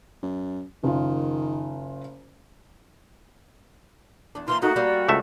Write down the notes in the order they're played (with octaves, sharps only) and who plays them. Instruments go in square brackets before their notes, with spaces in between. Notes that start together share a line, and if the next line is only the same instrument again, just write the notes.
[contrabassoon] F#2
[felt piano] F#1 F4 [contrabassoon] D#3
[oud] E2 D4
[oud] E3 A#3 F4 [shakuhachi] C6
[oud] A3 A#3 D#4 [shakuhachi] F#4
[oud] G3 A#3
[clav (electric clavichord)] C#2 A3 E5 [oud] C4